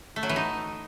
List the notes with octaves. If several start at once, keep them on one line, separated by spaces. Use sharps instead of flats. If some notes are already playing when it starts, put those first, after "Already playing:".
A3
F#3
E3
D#4